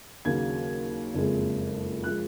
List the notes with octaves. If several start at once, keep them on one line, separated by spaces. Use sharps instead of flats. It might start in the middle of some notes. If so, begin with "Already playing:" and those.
D#2 C#3 F#3 A#3 G#6
F#1 F2 C#3 G#3
F3 G#3 F#6